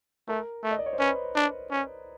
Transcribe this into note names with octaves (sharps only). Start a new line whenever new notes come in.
A3 A#4
A3
D#5
D5
C#5
C5
C#4 B4
D4
C#4